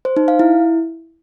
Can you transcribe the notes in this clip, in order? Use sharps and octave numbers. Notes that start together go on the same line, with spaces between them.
C5
D#4
F5
E4